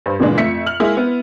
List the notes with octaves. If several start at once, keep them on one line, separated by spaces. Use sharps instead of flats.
G2 C5
A#2 C#3 E3 G#3 D4
F2 A3 E5 B6 C#7
F6 F#7
G#3 A#3 E4 G#4
B3 E4